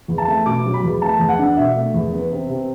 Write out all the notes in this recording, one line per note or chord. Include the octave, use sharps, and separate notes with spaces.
E2
A5
A3
B2 D6
F#3
B5
E2
A3 A5
E2
F#5
D4
B2 E5
A3
E2
B3
C3
C3